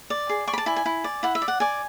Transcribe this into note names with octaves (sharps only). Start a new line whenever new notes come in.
D5
G#4
D5 C#6
B5
A5
E4 G#5
G#5
E4
D5
E4 F#5
E5
D5
F#5
D5 G#5